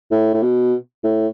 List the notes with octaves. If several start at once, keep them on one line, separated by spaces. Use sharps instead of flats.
A2
A2
B2
A2